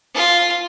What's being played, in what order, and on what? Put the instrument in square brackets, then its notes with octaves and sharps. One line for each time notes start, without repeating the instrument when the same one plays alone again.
[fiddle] F4